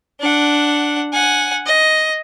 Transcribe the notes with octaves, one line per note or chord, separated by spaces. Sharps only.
D4 F#5
F#5 G#5
D#5